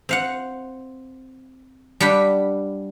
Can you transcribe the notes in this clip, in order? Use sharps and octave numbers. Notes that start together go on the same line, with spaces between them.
C4 F5 F#5
G3 D4 F#5 G5 B5